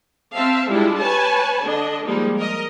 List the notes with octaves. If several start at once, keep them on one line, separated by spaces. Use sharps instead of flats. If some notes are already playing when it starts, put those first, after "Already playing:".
C4 E5 F5 A5
G3 G#3 D4 E4 F4
B4 C#5 G#5 A5
D3 D4 D#5
F3 G3 G#3 A#3 D#4
A#4 D#5